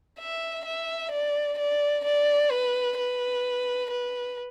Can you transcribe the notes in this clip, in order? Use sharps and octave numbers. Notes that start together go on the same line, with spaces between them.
E5
E5
D5
D5
D5
B4
B4
B4